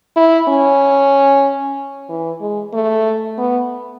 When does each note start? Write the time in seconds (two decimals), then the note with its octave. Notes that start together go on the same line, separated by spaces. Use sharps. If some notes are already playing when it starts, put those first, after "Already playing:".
0.16 E4
0.49 C#4
2.09 E3
2.41 G#3
2.73 A3
3.38 B3